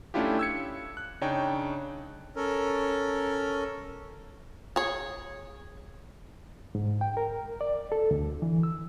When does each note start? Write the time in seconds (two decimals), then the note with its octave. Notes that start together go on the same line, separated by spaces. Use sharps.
0.14 A3 C#4 D4 E4 F4 G4
0.39 E6 G#6 C#7
0.97 F#6
1.21 C#3 D4 D#4 C#5 G5
2.36 C#4 A4 A#4
4.76 G#4 C#5
6.75 G#2
7.01 G5
7.17 A#4
7.61 D5
7.92 A4
8.11 D2
8.42 E3
8.63 E6